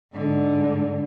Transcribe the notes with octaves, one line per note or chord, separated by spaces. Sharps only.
G#2 D3